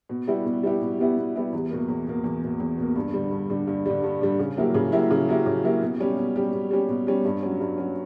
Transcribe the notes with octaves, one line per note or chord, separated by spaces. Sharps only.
B2
G3 B3 E4 G4
B2
G3 B3 E4 G4
B2
G3 B3 E4 G4
B2
G3 B3 E4 G4
E2
B2 A#3
E2
B2 A#3
E2
B2 A#3
E2
B2 A#3
G2
D3 G3
G2
D3 G3
G2
D3 G3
G2
D3 G3
C#3
F#3 A#3 E4 G4
C#3
F#3 A#3 E4 G4
C#3
F#3 A#3 E4 G4
C#3
F#3 A#3 E4 G4
B2
G3 C#4 G4
B2
G3 C#4 G4
B2
G3 C#4 G4
B2
G3 C#4 G4
G2
F#3 C#4
G2
F#3 C#4